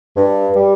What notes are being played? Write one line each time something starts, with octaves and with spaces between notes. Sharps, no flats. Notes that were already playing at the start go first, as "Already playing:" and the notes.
G2
G3